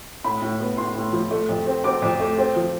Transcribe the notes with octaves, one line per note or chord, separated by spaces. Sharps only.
A2 B5
A2
B3
A2 C6
A2
F3
A3
F2
C4
C4 D6
F2
A3
C4
F3